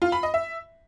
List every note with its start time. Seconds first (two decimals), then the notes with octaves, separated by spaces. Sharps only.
0.02 F4
0.12 B5
0.23 D#5
0.34 E5